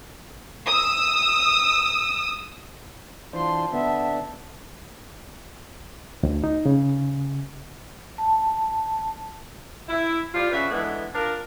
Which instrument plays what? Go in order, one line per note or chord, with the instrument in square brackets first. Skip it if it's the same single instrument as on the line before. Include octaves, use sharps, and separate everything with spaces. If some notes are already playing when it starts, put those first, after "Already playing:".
[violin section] D#6 E6
[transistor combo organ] E3 D4 C5 [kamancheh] F4 C6 [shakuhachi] A5
[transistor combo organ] D3 D4 [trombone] B3 [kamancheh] E5
[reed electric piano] D2
D#4
C#3
[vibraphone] A5
[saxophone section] E4
G3 F4
C#3 F#4 B4 E5
D3 E3 G#3 B3
D4 F4 A#4